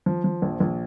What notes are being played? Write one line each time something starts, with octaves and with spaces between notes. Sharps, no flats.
F3
F3
A#1
A#1